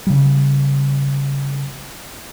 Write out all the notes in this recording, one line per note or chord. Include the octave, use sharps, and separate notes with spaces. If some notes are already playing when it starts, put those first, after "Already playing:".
C#3 G3